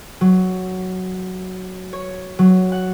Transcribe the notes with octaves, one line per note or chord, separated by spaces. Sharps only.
F#3
C#5
F#3
F#5